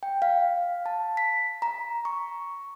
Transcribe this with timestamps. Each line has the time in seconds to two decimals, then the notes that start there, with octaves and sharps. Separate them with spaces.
0.03 G5
0.22 F5
0.86 A5
1.17 B6
1.62 A#5
2.05 C#6